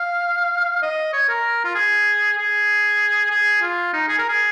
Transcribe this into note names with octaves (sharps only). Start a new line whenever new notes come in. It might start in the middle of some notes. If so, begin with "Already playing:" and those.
Already playing: F5
D#5
C#5
A#4
F4
G#4
G#4
G#4
F4
D#4
G#4
A#4
G#4